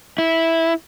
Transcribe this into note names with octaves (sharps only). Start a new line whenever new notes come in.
E4